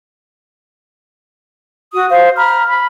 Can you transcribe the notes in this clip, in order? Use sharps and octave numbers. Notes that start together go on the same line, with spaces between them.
F#4 D#6
C5 F5
A#5 B5 F6
B5